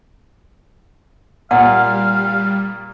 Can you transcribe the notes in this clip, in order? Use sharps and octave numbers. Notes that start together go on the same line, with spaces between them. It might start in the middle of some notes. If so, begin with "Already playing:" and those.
A#2 G3 F5 F#5